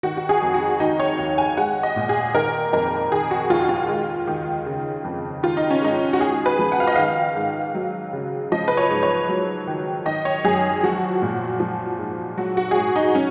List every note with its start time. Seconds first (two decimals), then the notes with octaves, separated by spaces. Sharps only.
0.03 D#3 F#4
0.17 F#4
0.29 G#4
0.42 F2
0.54 F#4
0.80 D#3 D#4
1.00 C#5
1.18 D#2
1.38 G#5
1.57 G#3 F#5
1.83 D#5
1.96 A#2
2.09 G#4
2.34 D#3 A#4
2.73 F2 A#4
3.12 D#3 G#4
3.31 F#4
3.50 D#2 F4
3.69 F4
3.89 G#3
4.27 D#3
4.66 C#3
5.04 F2
5.43 D#3 F4
5.57 D#4
5.71 C#4
5.82 G#2 D#4
6.13 F#4
6.20 G#3 G#4
6.46 B4
6.59 F3
6.72 F#5
6.80 F5
6.87 D#5
6.96 D#3 F5
7.36 G#2
7.75 F#3
8.13 C#3
8.52 F3 D#5
8.68 B4
8.77 C#5
8.90 G#2
9.03 C#5
9.29 F#3
9.68 D#3
10.06 D#3 D#5
10.25 C#5
10.45 F#2 G#4
10.83 F3 F#4
11.22 A#2
11.60 F3
11.99 G#2
12.37 F#3 F#4
12.57 F#4
12.71 G#4
12.76 G#2 F#4
12.96 D#4
13.15 F#3 C#4